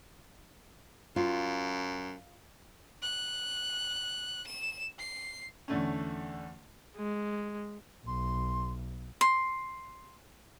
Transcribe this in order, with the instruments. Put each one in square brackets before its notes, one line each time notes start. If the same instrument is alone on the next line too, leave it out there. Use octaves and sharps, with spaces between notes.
[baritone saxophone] F#2 [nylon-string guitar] F4
[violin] F#6
E7
C7
[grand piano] E2 D3 A3 C#4
[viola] G#3
[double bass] B1 [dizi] C6
[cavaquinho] C6